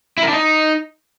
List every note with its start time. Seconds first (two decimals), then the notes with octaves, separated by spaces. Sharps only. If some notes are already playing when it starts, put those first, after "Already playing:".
0.18 E4
0.23 A#4
0.28 D4
0.33 D#4